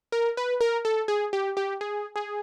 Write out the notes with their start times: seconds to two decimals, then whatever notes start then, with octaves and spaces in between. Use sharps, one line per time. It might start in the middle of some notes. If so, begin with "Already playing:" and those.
0.12 A#4
0.37 B4
0.61 A#4
0.85 A4
1.08 G#4
1.33 G4
1.57 G4
1.81 G#4
2.16 G#4